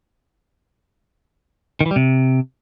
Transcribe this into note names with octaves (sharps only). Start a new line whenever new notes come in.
D#3
E3
G3
C3